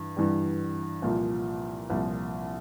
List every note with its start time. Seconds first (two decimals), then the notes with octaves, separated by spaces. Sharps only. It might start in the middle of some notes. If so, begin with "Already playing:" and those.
Already playing: G2 E3
0.17 G2 E3 G3
1.02 C2 A#2 F3
1.90 C2 A#2 F3